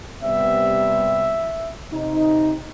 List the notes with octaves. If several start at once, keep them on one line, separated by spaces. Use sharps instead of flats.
C3 G3 B3 E5
C3 D#4